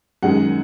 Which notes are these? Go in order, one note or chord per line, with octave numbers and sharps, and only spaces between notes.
F#2 D#3 G#3 F#5